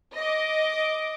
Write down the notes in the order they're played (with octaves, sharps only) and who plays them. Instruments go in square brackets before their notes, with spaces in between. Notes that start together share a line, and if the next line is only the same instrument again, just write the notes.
[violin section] D#5 D6